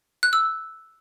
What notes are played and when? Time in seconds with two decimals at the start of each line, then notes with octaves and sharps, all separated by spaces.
0.23 F#6
0.33 E6